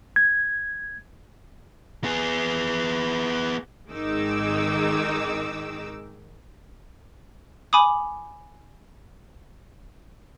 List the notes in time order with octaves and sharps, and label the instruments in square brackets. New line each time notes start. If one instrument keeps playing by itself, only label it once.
[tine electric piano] G#6
[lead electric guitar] B3 G#4
[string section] G#1 D#3 G#3 D#4 D6 E6
[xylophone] G#5 B5 D6 D#6